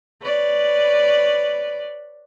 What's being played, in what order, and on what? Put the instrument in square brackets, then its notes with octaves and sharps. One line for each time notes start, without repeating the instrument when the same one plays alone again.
[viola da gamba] B4 C#5 D5